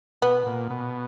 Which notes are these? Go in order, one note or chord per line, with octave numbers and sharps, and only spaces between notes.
B2 B3
A#2
B2